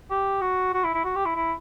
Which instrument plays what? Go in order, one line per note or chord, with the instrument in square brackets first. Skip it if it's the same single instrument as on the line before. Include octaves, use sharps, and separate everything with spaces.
[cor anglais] G4
F#4
F#4
E4
E4
F#4
G4
E4
E4